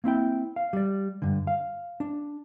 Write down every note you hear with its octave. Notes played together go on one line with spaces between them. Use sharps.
A#3 C4 E4 G5
F5
G3 D5
G2 D3
F5
D4